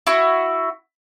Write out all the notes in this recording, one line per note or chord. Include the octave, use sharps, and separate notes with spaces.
E4 F#4